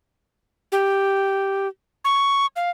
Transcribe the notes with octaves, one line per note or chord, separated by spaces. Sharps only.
G4
C#6
F5